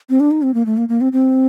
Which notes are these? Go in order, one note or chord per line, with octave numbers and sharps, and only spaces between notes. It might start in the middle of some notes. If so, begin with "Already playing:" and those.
C4
D4
D#4
C4
A#3
A3
A#3
A#3
C4
C4